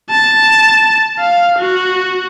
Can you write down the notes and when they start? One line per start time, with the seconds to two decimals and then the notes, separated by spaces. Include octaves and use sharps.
0.10 A5
1.20 F5
1.59 F#4